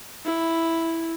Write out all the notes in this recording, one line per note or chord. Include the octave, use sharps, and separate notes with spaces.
E4